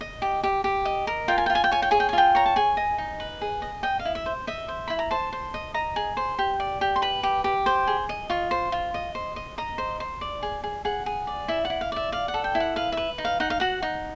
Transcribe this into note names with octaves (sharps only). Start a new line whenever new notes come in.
D#5
G4
G4
G4
D#5
A#4
F4 G5
G#5
F4 G5
G#5
G5
C#5 G#5
G5
G#4 G#5
G5
G#5
F4 G5
C#5 A#5
A5
G#4 G#5
D#5
D#4
B4
G#4
D#5
D#5 G5
F5
E4
E5
C5
D#5 E5
C5
E4 B5
A#5
C5 A5
C5
D#5
D#5 A#5
G#4
C5
G4
D5
G4
C6
B4 B5
G4
G4
C5
G#4
D#5
F4 C#6
C5
F4
D#5
C5
D#5
D#5 A#5
C5
C5
D5
G#4
G#4
G#4 F#5
G#4
D5
E4 E5
F#5
E4
F5
D5 E5
D5 F5
F#5
A4
G5
E4
F#5
B4 F5
B4 E5
D#4
F5
D#4 F#5
F5
F#4 F#5
D#4